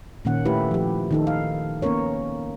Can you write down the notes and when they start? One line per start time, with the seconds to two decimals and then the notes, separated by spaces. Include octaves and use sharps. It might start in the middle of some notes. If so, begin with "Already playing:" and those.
0.25 A#2 D#3 A#3 C#4 F#5
0.45 A3 E4 G4 B4
0.71 F3 G4
1.11 D#3 D#4 A4
1.27 F5
1.82 A#3 B3 C#4 A#4 C#5